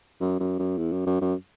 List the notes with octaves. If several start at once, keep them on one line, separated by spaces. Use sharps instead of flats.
F#2
F#2
F#2
E2
F#2
F#2
F#2